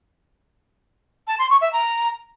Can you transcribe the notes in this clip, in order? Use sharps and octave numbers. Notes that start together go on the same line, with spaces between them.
A5
C6
C#6
E5
A#5